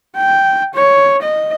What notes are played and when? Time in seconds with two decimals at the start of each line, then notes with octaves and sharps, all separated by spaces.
0.17 G5
0.74 C#5
1.22 D#5